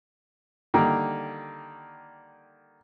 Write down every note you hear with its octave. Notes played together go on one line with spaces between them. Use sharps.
D3 D#3 G3 A#3